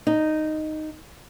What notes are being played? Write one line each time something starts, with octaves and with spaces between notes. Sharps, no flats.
D#4